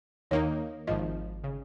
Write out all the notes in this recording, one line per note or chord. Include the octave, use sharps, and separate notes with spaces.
D#2 D#3 A#3 D#4 C#5
G#1 G#2 F3 D#5
C#3